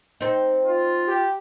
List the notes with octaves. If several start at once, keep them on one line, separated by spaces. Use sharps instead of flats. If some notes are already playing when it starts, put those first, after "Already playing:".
C4 D#4
F4
G4